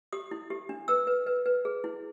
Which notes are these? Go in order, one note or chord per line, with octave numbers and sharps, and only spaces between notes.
G4 D#6
E4
G4
D4
B4 E6
B4
B4
B4
G#4
E4